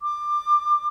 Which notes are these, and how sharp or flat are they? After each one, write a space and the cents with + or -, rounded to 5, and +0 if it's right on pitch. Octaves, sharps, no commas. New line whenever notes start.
D6 +20